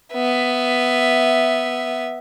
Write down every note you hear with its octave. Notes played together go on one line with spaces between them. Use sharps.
B3 E5